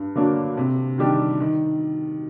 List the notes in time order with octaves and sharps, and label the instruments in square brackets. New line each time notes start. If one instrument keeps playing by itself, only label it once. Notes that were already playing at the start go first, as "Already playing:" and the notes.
Already playing: [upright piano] G2
D3 F#3 A#3 D4
C3
D#3 G3 D4 G4
D#3